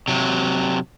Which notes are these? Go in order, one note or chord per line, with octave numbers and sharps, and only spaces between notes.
C3 F#3